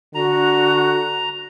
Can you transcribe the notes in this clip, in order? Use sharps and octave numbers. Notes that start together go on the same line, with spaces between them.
D3 F#4 A#5